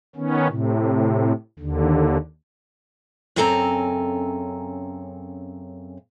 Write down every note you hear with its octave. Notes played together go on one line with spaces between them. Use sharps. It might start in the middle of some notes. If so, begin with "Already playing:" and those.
D#3 B3 C#4
A2 C3
D#2 D3
F#2 C#3 C4 A4 G#5 A#5